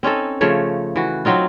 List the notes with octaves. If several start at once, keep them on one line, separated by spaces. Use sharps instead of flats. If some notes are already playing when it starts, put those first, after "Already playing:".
C4 C#4 D#4 A4
C#3 F3 A3 C#5
E3 F#4
F#3 C4 D#4 F4